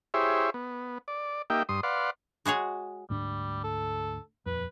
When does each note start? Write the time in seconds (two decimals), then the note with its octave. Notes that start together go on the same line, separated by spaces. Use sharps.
0.14 E4 G4 G#4 C5 C#5 E5
0.54 B3
1.08 D5
1.50 A#3 D#4 G4 E5 G5
1.69 G2 C6 D#6
1.83 B4 D5 F5 F#5 C6
2.45 G#3 F#4 G#4 C#5
3.10 D2 G#2 G3 D4
3.64 A4
4.46 D#1 F2 B4